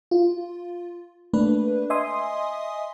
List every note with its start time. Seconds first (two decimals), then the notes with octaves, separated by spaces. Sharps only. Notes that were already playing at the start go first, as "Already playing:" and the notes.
0.11 F4
1.33 A3 A#3 D4 B4
1.90 D#5 E5 G#5 C6 D#6